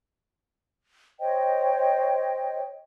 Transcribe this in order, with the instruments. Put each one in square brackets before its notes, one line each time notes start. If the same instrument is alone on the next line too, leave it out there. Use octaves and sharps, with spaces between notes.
[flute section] C5 C#5 D#5 G5